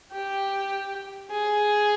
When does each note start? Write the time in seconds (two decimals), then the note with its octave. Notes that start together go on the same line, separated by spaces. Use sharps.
0.12 G4
1.30 G#4